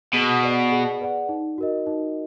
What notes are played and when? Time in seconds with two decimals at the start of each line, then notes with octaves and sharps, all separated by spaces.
0.13 B2 G#4
0.43 B4 D5 F#5
0.72 G#4
1.01 B4 D5 F#5
1.29 D#4
1.58 F#4 A#4 D#5
1.87 D#4